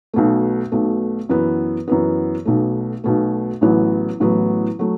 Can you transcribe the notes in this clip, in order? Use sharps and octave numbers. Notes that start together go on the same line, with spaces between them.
B1 B2 A3
B1 B2 A3
F#2 E3 B3
F#2 E3 B3
B1 B2 A3
B1 B2 A3
A1 A2 F#3 B3
A1 A2 F#3 B3
F#3 A3